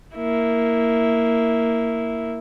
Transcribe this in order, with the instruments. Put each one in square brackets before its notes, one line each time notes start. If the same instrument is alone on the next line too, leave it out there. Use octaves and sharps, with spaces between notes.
[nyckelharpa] A#3 E4